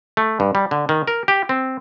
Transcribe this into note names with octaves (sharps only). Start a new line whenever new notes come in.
A3
G2
G3
D3
D#3
A#4
G4
C4